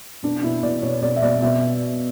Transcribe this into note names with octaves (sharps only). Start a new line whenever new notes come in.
B2 D4
B2 E4
B2 D5
B2 C#5
B2 D5
E5
B2 D5
B2 E5